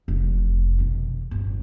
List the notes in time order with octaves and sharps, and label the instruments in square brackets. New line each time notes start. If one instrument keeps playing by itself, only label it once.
[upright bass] F1
B2 D#3
G1 A2